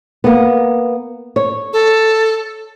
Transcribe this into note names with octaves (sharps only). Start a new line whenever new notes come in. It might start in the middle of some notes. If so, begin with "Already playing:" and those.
A#3 B3
C#5
A4